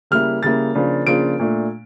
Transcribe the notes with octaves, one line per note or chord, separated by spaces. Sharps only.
C#3 G3 A#3 E4 F6
C#3 G3 A#3 E4 A6
C#3 F3 A#3 D4 F4
C#3 F3 A#3 D4 F4 D7
A#2 A3 D4